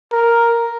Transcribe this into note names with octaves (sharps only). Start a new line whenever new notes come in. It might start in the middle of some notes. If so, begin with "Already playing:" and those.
A#4